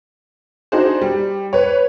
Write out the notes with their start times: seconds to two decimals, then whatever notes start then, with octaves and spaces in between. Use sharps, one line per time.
0.72 D4 D#4 F#4 G#4 C5
1.01 G3
1.53 B4 C#5